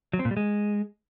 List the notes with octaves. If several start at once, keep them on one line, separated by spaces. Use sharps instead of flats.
F#3
C4
A#2
G3
G#3